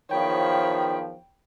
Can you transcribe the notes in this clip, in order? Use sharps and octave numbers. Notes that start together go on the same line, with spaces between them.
E2 D#3 F3 C#5 G5 B5